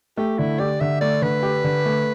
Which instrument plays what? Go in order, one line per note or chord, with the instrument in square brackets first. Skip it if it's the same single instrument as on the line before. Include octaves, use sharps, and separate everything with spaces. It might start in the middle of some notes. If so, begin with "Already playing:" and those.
[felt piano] A3 [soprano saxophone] G4
[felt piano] D3 [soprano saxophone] E4
[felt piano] G4 [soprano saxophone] D5
[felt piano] D3 [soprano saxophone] E5
[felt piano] A3 [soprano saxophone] D5
[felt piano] D3 [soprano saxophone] B4
[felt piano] G4
D3
A3